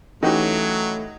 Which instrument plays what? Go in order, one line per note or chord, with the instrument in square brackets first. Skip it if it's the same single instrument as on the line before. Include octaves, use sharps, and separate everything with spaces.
[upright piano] E3 C#4 [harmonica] F#3 [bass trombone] A3 [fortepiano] D#4 F#4 G4